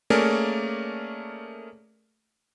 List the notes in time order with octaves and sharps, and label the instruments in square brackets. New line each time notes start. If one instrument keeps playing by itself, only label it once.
[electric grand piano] A3 A#3 C#4 G#4 A#4 D5